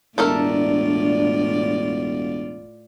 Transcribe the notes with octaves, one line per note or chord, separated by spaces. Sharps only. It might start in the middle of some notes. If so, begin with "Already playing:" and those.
E1 A2 A3 D4 F4 A4 A#4 D5